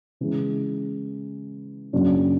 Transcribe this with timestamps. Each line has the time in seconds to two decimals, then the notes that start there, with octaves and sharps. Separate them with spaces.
0.21 C#3 E3 G#3
1.93 F#2 C#3 F#3 A#3 D4